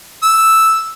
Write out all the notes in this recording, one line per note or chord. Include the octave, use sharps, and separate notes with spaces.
E6